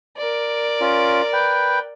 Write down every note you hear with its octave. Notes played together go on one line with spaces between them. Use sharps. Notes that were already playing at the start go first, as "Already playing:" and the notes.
A#4 D5
C#4 F4
B4 G5